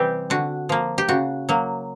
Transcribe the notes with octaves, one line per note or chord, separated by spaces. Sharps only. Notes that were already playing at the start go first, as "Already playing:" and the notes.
Already playing: C3 E3 G3 C4 G4
D3 F#4
F3 A#3
G4
C#3 F#4
F#3 A#3